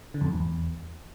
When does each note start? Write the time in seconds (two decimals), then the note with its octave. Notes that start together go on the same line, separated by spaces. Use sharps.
0.14 D3
0.21 F2
0.28 G#2
0.34 E2